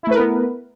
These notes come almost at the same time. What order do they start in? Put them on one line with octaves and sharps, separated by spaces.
E4 A3 B4 A#4 B3